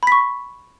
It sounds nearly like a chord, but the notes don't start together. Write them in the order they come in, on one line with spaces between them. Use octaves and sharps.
B5 B6 C#6